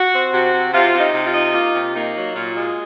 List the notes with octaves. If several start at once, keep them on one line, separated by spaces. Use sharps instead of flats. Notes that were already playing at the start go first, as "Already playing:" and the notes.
Already playing: F#4
C4
C3 F#4
C3
C3 F4
C3
D#4
C3
F4
D#4
A#3 F4
C3
A#3 D#4
F#3
A#2 F4
G#3